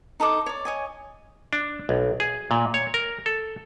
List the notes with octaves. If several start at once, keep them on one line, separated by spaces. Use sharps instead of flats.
D#4 A4 D#5 D6
C#5 D5
C#5 D#5 G#5
D4
B1
G#4
A#2
C#5
A#4
A4